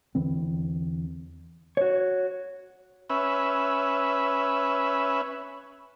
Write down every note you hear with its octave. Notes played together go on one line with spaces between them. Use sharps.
E2 D3 E3 C4
F#4 C#5
C#4 B4 E5